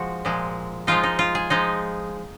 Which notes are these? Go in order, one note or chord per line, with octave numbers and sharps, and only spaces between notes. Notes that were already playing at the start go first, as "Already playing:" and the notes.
Already playing: F3 G#3 F#4
A#2 F3 G#3
F3 G#3 D#4 F4
D#4
F4
G#4
F3 G#3 D#4